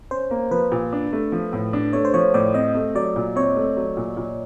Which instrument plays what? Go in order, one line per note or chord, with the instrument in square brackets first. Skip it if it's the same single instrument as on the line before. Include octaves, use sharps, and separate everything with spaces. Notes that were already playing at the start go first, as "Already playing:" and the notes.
[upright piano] C#4 [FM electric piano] C5
[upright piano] A#3
[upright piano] F3 [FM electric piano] B4
[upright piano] A#2
D4
A3
F3
A2
D4
[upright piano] A3 [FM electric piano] C#5
[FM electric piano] C5
[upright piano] F3 [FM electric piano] C#5
[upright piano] A2 [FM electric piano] D5
[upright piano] C4 [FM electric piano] D#5
[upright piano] A3
[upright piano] F#3 [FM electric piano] D5
[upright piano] A#2
[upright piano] C4 [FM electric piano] C#5
[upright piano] A3
F#3
A#2
A#2